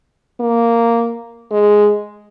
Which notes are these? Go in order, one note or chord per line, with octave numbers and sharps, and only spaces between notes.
A#3
G#3